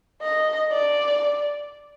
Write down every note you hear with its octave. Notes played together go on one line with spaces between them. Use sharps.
D#5
D5